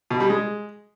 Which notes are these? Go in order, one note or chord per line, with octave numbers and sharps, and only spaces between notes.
B2
G3
G#3